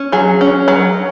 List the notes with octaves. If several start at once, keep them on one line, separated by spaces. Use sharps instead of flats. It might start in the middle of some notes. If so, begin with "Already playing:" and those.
Already playing: C#4
F#3 G#4
C#4
F#3